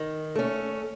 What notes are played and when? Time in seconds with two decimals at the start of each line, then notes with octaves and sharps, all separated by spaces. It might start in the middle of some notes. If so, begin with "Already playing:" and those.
Already playing: D#3
0.35 A3 C#4